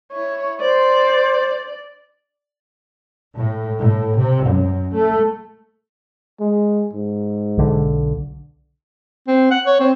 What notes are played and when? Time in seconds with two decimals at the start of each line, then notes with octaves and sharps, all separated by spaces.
0.12 E4 C#5
0.60 C5 D5
3.37 A2
3.80 A2
4.17 C3
4.47 F#2
4.94 A3
6.40 G#3
6.93 G#2
7.57 B1 D3
9.28 C4
9.51 F#5
9.66 C#5
9.80 C4